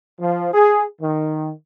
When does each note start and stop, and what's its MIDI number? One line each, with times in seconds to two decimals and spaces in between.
0.21 0.53 53
0.53 0.83 68
1.01 1.51 51